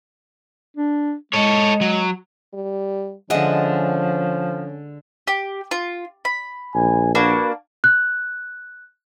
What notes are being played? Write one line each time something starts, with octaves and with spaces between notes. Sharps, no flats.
D4
G#3 A4 C#5
F#3
G3
D3 F3 G#3 C#4 D#5 E5 F#5
G4
F4
B5
A#1 G#5
A#3 D4 F#4 B4
F#6